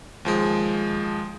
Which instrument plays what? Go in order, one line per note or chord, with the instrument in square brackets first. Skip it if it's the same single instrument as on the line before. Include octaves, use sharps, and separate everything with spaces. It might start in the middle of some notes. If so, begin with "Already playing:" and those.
[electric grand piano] D#2 F3 G#3